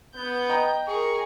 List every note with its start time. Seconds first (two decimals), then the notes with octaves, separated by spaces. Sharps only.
0.14 B3 G6
0.49 D#5 G5 A#5
0.87 G#4 A#4 C#6